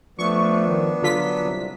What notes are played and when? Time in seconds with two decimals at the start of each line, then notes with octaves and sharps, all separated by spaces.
0.19 F3 A3 B3 D4 C#6
0.67 D#3
1.02 D3 F#3 F4 B6
1.44 C2